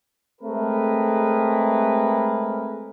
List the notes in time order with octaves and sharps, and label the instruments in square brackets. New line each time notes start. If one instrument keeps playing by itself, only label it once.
[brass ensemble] G#3 A3 C4 G#4 A#4 B4